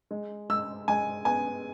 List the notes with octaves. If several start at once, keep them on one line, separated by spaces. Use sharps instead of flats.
G#3
G#3 E6
G#3 G#5
B3 G#5